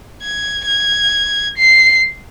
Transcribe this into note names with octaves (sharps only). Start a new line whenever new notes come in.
G#6
G#6
C7